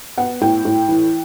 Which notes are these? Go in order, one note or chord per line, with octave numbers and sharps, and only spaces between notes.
B3 F#5
A2 G5
A2
E3